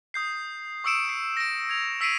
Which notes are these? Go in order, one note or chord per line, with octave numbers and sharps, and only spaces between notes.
D#6 G6 C7
C#6 D#6 E6 C#7 D7 E7
C7
A#6 D7
G#6 F7
E6 B6 C7 D7 D#7 F#7